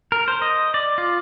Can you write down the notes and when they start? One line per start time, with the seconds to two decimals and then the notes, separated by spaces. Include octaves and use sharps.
0.12 A#4
0.28 C5
0.42 D#5
0.74 D5
0.98 F4